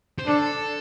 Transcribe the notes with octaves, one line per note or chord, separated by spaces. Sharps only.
C5
D4 A4